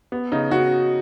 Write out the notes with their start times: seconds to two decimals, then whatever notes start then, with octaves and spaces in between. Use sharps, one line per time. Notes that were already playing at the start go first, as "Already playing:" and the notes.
0.12 B3
0.32 C#3 D#4
0.51 C#3 F#4